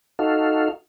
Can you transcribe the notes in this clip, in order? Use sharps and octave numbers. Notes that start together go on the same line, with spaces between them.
D#4 F#4 A4 F5